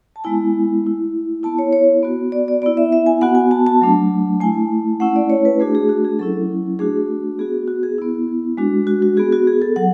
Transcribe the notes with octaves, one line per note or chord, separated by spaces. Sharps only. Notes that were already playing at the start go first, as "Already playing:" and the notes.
A5
G#3 B3 E4 G#5
A3 E4
B3 E4 A5
C#5
C#5
B3 F#4
D5
D5
B3 E4 D5
E5
E5
G#5
B3 F#4 F#5
G#5
A5
A5
F#3 A3 D4
A3 E4 G#5
A3 C#4 E4 F#5
D5
C#5
B4
A3 D4 F#4 G#4
G#4
F#4
G#4
F#3 C#4 E4 A4
A3 D4 F#4 G#4
B3 F#4 G#4
F#4
G#4
B3 E4
G#3 D4 F#4
F#4
F#4
B3 F#4 G#4
F#4
G#4
A4
F#3 F#5